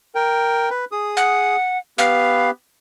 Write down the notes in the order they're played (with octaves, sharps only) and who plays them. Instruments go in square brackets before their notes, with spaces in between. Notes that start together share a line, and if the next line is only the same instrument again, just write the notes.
[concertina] A#4 G5
B4
G#4 D#6
[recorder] F#5
[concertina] B3 G4 B4 [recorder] F5